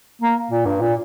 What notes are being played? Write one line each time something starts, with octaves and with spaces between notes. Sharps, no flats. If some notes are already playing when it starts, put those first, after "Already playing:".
A#3
A#2
G2
A#2